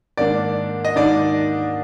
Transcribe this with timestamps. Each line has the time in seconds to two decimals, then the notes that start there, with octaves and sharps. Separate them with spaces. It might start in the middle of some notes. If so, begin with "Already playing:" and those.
0.17 G#2 D#3 A#3 D4 D5
0.85 D#5
0.96 G#2 D#3 A#3 D4 D5